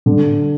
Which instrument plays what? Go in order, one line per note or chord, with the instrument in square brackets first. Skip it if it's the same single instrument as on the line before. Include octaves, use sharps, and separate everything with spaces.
[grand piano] D3